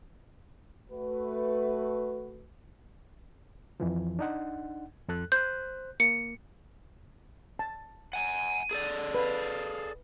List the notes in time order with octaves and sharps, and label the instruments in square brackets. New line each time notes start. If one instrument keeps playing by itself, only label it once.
[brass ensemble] A3 F#4 B4
[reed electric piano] F2 E3 F3
D4 D#4 F#5
F2 A4 F#6
[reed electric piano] C5 F#6 [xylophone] G6
[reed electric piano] A#3 [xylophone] C#7
[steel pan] A5
[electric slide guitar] F#5 G#5 [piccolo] D#7
[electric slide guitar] G#4 A4 D5
[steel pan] B4 [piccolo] F5